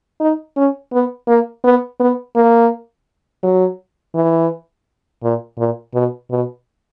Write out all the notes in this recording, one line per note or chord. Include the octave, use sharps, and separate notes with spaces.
D#4
C#4
B3
A#3
B3
B3
A#3
F#3
E3
A#2
A#2
B2
B2